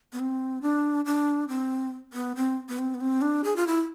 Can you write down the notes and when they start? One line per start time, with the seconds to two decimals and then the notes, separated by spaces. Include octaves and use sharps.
0.13 B3
0.20 C4
0.62 D4
1.06 D4
1.49 C4
2.13 B3
2.36 C4
2.69 B3
2.79 C4
2.95 B3
3.01 C4
3.22 D4
3.44 G#4
3.56 F4
3.67 E4